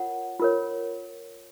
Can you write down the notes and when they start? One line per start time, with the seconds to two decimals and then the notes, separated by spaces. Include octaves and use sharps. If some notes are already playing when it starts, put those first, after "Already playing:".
Already playing: F4 A#4 C#5 F#5
0.40 F4 A#4 C#5